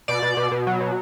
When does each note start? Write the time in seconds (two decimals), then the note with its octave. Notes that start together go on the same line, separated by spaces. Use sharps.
0.08 B2 D5
0.22 B2
0.37 B2
0.52 B2
0.67 F#3
0.81 B2